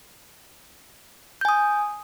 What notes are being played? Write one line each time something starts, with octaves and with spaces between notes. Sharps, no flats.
G#5 D#6 G6